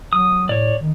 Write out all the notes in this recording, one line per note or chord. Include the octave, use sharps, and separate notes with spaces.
F#3 D#6
A2 C#5 D5
D#3